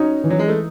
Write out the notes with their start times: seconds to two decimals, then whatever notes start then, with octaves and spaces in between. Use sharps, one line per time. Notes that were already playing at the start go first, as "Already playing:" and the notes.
Already playing: C#4 D#4 F#4
0.24 E3
0.30 F#3
0.39 G#3
0.48 A3